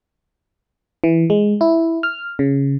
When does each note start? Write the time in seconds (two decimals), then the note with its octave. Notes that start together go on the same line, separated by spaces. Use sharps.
1.04 E3
1.30 G#3
1.61 E4
2.03 F6
2.39 C#3